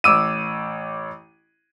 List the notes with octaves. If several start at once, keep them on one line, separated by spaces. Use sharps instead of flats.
A1 D6 E6 D#7